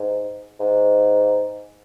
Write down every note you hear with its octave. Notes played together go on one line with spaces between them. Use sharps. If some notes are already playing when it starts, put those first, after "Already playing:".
Already playing: G#2
G#2